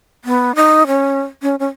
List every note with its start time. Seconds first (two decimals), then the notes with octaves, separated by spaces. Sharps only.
0.25 B3
0.56 D#4
0.87 C#4
1.42 C#4
1.59 C#4